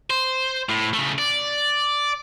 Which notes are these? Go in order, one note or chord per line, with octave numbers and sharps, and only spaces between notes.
C5
A2
C#3 A3
D5